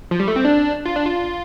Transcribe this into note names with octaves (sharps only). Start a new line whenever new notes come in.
F3
G3
A3
C4
D4
F4
D4
F4